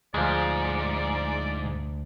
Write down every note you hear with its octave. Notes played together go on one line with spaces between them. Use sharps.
D2 G#2 F3 G#3 D5